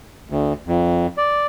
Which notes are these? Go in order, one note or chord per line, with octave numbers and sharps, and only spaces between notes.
D2
F2
D5